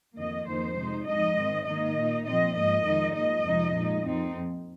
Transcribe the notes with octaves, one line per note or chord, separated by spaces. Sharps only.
F2 D#3 A#3 D#5
F2 D#3 A#3 D#4 C5
C3 G#3 D#4
F2 F3 G#3 D#4 D#5
G#2 D#3 C4
G#2 D#3 A#3 D#4 D#5
A#2 A#3 D#4
A#2 F3 C4 D#5
G#2 F3 A#3 D#5
F2 D#3 G#3 D#4
G#2 F3 A#3 D#5
F2 C3 F3 G#3 D#4
A#2 G#3 D#4
F2 F3 C4 D#4